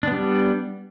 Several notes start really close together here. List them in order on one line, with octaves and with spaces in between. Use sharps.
D4 B3 G3